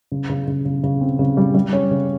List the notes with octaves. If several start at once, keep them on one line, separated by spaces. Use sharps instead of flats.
C#3
C#3
C#3
C#3
C#3
C4
C#3
G3
G3
C#4
C#3